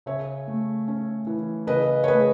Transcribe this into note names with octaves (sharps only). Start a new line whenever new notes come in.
C#3 C#5 E5
A3
C#4
E3
C#3 B4 D#5
C#5
A3 G#4 B4